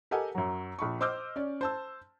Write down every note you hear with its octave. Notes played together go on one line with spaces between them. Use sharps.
G4 A4 A#4 D#5 F#5 G#5
F#2 F#3
A#1 B5 C#6
C5 D#5 D6 E6 F6 G6
C#4 D5
C5 A5 E6